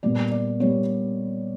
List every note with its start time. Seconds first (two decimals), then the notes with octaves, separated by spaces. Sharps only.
0.03 A#2 G3 B3 D5
0.32 D5
0.60 A#2 G3 B3 C#5